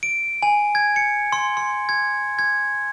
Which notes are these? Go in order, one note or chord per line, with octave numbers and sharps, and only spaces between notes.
D7
G#5
G#6
C#7
C6
C6
G#6
G#6